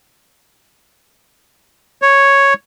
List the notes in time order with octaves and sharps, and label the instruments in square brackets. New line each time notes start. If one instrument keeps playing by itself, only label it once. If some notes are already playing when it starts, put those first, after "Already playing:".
[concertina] C#5